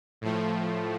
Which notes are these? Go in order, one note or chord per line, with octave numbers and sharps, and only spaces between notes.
A2 F3 A3